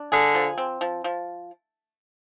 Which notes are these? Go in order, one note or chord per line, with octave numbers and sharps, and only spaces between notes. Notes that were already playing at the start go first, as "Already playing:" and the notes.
Already playing: D4
D3 G#4
F3
C4
F3
F3